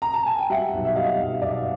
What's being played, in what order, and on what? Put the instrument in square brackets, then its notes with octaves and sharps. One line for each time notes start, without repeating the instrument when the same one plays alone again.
[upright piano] A#5
A5
G#5
G5
G3 E5 F#5
B1
E5
G3 D#5 F5
B1
B1 D5 E5